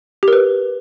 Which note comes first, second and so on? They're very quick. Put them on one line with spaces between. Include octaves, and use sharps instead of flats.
G4 A#4 B4